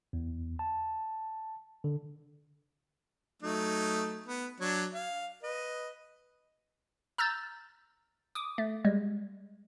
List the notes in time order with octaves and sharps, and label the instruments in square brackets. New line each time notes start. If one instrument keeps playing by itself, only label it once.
[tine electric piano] E2
A5
D3
[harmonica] F#3 A3 D#4
B3
F#3 D4 C#5
F5
B4 D#5
[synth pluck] A#5 E6 F6 G6 A6
D6 D#6
A3
G3 G#3